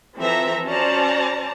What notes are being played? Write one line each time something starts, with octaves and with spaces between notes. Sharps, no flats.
E3 F3 C4 A4 E5 A#5
C#4 F#4 C5 D5 A5 A#5